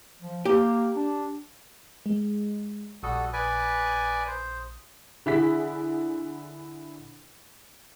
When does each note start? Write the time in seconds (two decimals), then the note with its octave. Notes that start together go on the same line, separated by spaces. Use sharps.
0.22 F3
0.45 A#3 G4
0.96 D4
2.06 G#3
3.03 A#1 G3 F#4 A4 D#6
3.33 B4 D5 G#5
4.27 C5
5.26 D3 E4 G#4 B6